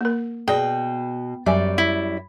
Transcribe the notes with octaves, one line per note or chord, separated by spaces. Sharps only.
A#3 A#4
B2 G#4 D5 G5
F#2 G3 D5 E5 G#5
E4